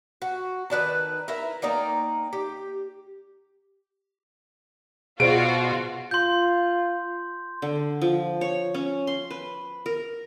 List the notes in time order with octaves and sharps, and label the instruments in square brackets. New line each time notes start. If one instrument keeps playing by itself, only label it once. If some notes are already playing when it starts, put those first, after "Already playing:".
[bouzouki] F#4
D#3 B4 D5 A5
E4 A#4 B4 E5
A#3 D#4 D5 G5
G4
[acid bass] B2 [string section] F4 F#4 F5 [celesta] G#4 C5 D5 [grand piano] D7
[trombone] F4 [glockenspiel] C6 G6
[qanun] D3
F3
C#5
C#4
C6
B4
A#4